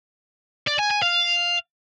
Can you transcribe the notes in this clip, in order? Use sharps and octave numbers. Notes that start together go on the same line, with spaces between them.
D5
G#5
G#5
F5